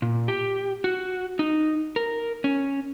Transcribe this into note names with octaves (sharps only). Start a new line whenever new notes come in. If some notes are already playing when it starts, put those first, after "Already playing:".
A#2
G4
F#4
D#4
A#4
C#4